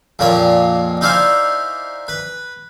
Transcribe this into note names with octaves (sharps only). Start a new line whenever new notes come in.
F2 A#2 A#3 C#5 D5
D#4 E4 C5 D5 F5 G#5
B4